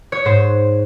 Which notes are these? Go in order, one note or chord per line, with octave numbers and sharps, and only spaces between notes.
C#5
G#2 C5